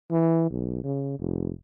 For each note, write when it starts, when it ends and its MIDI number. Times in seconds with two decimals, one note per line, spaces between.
0.11 0.47 52
0.50 0.81 35
0.84 1.17 49
1.19 1.51 29